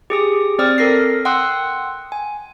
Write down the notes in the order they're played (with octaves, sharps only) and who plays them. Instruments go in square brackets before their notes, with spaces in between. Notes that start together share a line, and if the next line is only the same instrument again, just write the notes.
[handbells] G4 G#4 D#6
C4 C5 D5 D#6 F6
A4 A#4 A#6 C7
F#5 G5 C6 D#6 E6 F#6
G#5